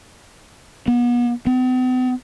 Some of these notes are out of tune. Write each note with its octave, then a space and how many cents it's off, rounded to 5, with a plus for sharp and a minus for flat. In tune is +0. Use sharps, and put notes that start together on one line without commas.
B3 -35
B3 +45